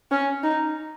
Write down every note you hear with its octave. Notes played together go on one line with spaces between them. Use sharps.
C#4
D#4